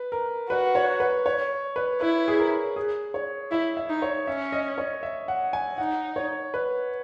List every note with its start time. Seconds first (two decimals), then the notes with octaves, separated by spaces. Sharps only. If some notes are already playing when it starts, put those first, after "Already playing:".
Already playing: B4
0.12 A#4
0.50 F#4 B4
0.75 C#5
1.00 B4
1.26 C#5
1.76 B4
2.01 E4 B4
2.28 G#4
2.39 A#4
2.76 G#4
3.14 C#5
3.51 E4 E5
3.77 E5
3.90 D#4
4.02 C#5
4.27 C#4 E5
4.52 D#5
4.78 C#5
5.03 E5
5.28 F#5
5.53 G#5
5.78 D#4 F#5
6.16 C#5
6.54 B4